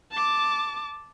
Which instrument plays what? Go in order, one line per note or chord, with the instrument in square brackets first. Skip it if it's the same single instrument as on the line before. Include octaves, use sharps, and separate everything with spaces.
[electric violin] A5 D6